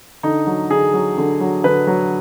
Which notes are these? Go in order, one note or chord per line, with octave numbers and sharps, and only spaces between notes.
D3 D#4
F#3
D3 G#4
F#3
D3
F#3
D3 B4
F#3